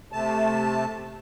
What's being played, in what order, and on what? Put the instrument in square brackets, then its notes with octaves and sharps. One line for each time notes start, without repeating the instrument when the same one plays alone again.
[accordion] C3 A3 A5